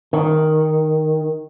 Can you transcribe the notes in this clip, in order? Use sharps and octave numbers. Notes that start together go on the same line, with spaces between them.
D#3